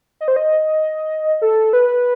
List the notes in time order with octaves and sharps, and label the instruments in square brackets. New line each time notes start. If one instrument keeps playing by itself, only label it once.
[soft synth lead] D#5
C5
D#5
A4
B4